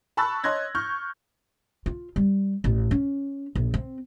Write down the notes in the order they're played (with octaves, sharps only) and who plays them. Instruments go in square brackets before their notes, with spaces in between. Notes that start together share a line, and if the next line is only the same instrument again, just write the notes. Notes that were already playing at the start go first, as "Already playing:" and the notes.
[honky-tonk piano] A5 B5 C#6 E6 F#6 A6
C#5 D#5 C6 F#6 G#6 A#6
C#6 F6 G6
[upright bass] F4
G3
A1
C#4
A#1
C4